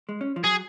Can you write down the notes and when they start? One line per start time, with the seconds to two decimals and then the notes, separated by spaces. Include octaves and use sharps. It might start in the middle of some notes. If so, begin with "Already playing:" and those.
0.09 G#3
0.21 C#4
0.36 F3
0.44 F#3 G#4